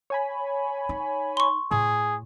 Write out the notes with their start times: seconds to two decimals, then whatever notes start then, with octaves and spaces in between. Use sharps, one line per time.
0.10 C#5 G#5 B5
0.89 D#4
1.37 C6 C#6
1.71 A2 G#4